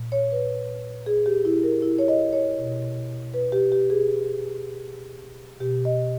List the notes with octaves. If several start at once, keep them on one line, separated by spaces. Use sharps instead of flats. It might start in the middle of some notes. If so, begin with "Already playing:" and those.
Already playing: A#2
C#5
B4
G#4
G4
E4
A#4
E4
C#5
D#5
C#5
B2
B4
G4
G4
G#4
B2 G4
D#5